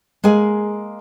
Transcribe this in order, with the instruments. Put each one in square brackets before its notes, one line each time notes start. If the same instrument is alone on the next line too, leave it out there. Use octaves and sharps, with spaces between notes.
[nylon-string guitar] G#3 A#3 G#4 G#5